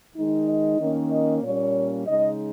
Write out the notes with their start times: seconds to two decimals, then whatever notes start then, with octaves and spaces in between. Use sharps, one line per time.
0.16 D#3 G#3 D#4
0.48 D#5
0.80 D#3 A#3 C#4
1.12 D#5
1.43 A#2 G3 A#3 C#4 C#5
2.07 C#3 G#3 D#4 D#5